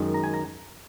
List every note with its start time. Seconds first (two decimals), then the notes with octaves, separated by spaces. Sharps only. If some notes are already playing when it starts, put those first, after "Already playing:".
Already playing: F#2 D#3 G#3 D#4
0.14 A#5
0.24 G#5
0.34 A#5